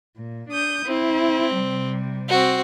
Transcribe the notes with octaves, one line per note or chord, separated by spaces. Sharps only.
A#2
D4 D#6 G6
C4 E4
C3 G3
C4 F#4